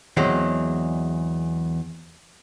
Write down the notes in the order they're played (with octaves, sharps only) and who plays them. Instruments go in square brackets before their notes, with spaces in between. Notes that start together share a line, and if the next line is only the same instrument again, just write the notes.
[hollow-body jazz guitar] E2 F#3 G#3 C4